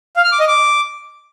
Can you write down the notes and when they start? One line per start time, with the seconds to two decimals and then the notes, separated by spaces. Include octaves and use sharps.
0.16 F5
0.24 F6
0.32 D6
0.40 D#5
0.48 D6